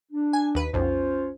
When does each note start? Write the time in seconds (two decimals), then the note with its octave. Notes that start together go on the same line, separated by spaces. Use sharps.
0.12 D4
0.33 G#5
0.55 D#2 B4
0.73 B1 F2 C#4 F4 C5